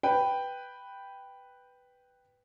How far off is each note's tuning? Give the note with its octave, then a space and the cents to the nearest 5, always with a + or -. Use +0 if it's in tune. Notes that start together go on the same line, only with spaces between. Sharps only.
B4 +0 G5 +0